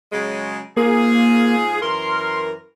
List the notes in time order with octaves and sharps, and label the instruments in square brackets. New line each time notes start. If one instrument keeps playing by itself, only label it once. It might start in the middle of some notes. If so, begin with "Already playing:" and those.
[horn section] C#3 F#3 G#3
[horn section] G#2 F4 G#4 [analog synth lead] A#3
[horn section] F#2 E3 A#4 [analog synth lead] C6